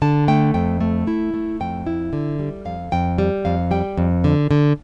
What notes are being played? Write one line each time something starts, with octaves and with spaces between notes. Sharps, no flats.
D3 A5
A3 G5
F2 G5
A3
E4
A3
F2 G5
E4
D3
G3
F2 F5
F2 G5
G3
F2 F5
G3 G5
F2
D3
D3